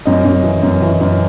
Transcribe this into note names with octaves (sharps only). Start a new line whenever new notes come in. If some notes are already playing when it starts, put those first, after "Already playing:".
F#2 D#5
F#2
E3
F#2
E3
F#2